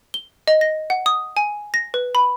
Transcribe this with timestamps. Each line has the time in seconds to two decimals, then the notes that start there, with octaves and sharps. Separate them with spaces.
0.14 G7
0.48 D#5
0.61 A#6
0.90 F#5
1.06 D#6
1.37 G#5
1.74 A#6
1.94 B4
2.15 B5